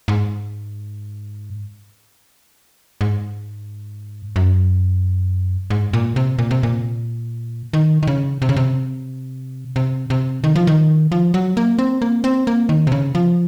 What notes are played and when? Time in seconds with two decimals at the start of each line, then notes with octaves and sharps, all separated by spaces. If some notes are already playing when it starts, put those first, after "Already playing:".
0.08 G#2
3.01 G#2
4.36 F#2
5.70 G#2
5.93 A#2
6.16 C3
6.39 A#2
6.51 C3
6.63 A#2
7.73 D#3
8.03 D#3
8.07 C#3
8.42 C3
8.49 C#3
8.57 C3
9.76 C3
10.10 C3
10.44 D#3
10.56 F3
10.67 D#3
11.12 F3
11.34 F#3
11.57 A#3
11.79 C4
12.02 A#3
12.24 C4
12.47 A#3
12.69 D#3
12.87 C3
12.92 C#3
13.15 F3